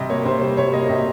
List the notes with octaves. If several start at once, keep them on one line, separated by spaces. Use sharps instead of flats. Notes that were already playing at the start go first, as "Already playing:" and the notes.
Already playing: C3 G3 D#5
A#3 C#5
C3 C5
G3 C5
C3 C#5
A#3 D#5
C3 D#5